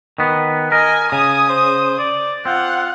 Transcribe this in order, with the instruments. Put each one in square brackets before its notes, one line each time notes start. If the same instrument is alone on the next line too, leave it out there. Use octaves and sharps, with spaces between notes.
[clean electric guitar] D#3 B3
[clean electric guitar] A#4 [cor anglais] D#5 [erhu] G#5
[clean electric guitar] C#3 [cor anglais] G#5 [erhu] D#6
[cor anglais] C5
D5
[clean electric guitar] C4 [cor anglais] F4 [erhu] F#5